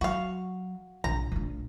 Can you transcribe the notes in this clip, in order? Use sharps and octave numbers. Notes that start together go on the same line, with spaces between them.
F#3 F#4 F5
A#1 A#5
A#1 A2